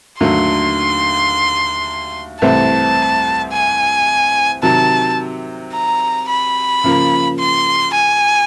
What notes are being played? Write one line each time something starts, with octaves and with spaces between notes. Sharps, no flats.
D#2 D3 F#3 A3 C6
C2 C3 E3 A3 C4 A5
G#5
C3 D#3 F#3 A5
A#5
B5
C#3 F3 A#3
C6
G#5